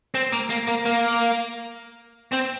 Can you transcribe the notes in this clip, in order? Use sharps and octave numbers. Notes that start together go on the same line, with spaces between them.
C4
A#3
A#3
A#3
A#3
C4